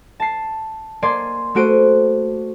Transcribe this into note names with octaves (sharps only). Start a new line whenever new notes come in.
A5 C7
A#3 D5 G#5 C6
A3 B3 F#4 C5 D7 D#7